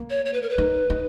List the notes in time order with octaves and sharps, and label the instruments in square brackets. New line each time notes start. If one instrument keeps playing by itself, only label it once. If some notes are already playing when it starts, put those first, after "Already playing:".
Already playing: [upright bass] A#3
[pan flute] C#5
C#5
B4
A#4
B4
[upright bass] D#4
D#4